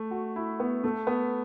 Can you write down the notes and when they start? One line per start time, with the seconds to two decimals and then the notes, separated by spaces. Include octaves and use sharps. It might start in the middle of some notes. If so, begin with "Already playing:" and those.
Already playing: A3
0.11 F#4
0.36 E4
0.60 B3
0.84 A3
1.07 B3